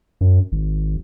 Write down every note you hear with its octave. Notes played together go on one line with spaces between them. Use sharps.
F#2
G#1